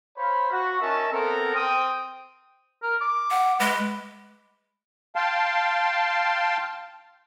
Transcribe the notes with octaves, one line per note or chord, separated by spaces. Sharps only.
C5 C#5 F5 B5
F#4
C#4 D#4 A#4 E5 A5
B3 C4 A4 A#4
C4 G5 D#6
A#4
D6
F#5
G#3 B4
F5 G5 A5 C6